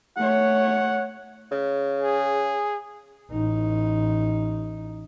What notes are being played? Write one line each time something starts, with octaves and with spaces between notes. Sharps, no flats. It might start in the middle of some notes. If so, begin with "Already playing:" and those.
A3 C#5 F#5
C#3
G#4
A1 D#4